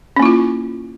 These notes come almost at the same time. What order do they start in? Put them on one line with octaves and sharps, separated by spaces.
C#4 A#3 E4 F4